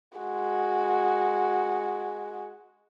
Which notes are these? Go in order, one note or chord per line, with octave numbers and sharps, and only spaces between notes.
G#3 F#4